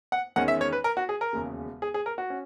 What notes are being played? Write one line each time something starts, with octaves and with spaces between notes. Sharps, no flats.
F#5
E2 D#3 G#3 C#4 F#5
E5
C#5
B4
A#4
F#4
G#4
A#4
E1 D#2 C#3
G#4
G#4
A#4
F#4
C#4